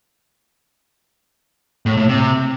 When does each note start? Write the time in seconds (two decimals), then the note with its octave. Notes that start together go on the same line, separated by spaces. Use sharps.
1.86 A2
1.97 A2
2.09 C3